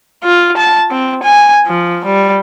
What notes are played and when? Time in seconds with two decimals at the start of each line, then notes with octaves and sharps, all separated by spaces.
0.24 F4
0.57 A5
0.91 C4
1.23 G#5
1.67 F3
2.05 G3